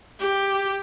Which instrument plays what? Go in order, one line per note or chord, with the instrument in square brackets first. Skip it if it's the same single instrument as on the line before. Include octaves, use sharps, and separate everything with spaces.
[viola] G4